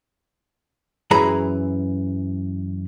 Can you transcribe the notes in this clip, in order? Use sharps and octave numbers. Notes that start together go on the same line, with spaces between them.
F#2 E3 G#4 A#5 B5